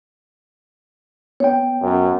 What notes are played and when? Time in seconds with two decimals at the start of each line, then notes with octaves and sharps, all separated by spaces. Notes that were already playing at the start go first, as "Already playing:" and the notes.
1.40 B3 C#5 G5
1.81 F#2